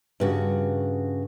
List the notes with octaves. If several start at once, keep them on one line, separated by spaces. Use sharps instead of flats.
G2 C#3 F#4